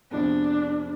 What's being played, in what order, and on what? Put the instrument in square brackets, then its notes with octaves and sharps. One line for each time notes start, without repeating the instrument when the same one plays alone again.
[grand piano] F2 C3 F3 G#3 B3 [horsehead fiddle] D4